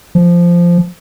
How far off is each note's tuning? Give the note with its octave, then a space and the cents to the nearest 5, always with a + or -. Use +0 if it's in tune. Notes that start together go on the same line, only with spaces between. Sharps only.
F3 -10